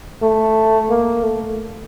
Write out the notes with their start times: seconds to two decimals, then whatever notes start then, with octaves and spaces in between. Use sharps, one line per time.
0.22 A3
0.90 A#3
1.23 A3